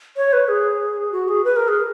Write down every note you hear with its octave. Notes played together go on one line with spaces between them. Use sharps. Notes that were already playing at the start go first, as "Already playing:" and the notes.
C#5
B4
G#4
F#4
G#4
B4
A#4
G#4